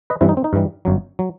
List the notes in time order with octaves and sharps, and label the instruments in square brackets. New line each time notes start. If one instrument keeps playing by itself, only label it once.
[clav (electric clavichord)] B4 D#5
G2 E3 G3 C4 E4
D#4
C4
D#4
G2 E3 G3
G1 F#2 F#3
F#3